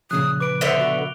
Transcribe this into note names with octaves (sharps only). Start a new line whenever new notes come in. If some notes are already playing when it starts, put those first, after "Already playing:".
A#2 C#3 F3 D#6 F#6
B4 D6 D7
D3 B3 C5 E5 F7 G7
F#4